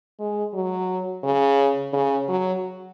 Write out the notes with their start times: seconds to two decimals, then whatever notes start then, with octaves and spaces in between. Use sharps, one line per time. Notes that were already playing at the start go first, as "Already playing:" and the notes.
0.20 G#3
0.54 F#3
1.24 C#3
1.93 C#3
2.28 F#3